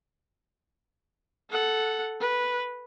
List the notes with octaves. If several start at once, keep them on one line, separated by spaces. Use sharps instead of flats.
A4 F#5
B4